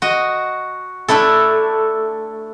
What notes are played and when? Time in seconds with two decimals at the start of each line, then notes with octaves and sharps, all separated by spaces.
0.02 F#4 D#5
1.08 A3 D4 E4 A4